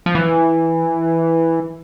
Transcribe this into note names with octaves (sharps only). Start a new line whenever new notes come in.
F3
E3